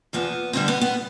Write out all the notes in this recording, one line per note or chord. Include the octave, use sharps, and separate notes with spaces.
E2 C3 F3 B3
D2 D3 G3 C4
B3
B3